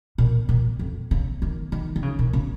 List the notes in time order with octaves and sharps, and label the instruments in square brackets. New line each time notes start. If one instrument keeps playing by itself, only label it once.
[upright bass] A#2
A#2
F2
C#3
D#3
D#3
D#3
C#3
A#2
C#3